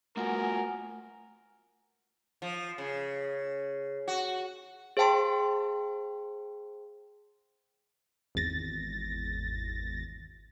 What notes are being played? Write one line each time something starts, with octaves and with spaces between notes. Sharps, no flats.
A3 F4 F#4 A#4 F#5 G#5
F3
C#3
F#4
G#4 C5 F5 G5 A5 C6
G#1 E2 A6 A#6